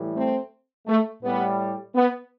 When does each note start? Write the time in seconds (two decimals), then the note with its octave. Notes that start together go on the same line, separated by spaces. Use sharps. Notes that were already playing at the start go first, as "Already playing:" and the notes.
Already playing: A2 E3 G3
0.15 A3 C4
0.87 A3
1.23 A2 G3 B3
1.95 B3